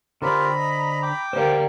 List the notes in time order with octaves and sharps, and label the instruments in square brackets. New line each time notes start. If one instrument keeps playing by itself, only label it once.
[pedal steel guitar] D3 C5 D5 [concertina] F4 G4 A#4 [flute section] A#5 B5
[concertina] D#5
G5 D6
[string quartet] D3 G3 A#3 [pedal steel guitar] C5 F#5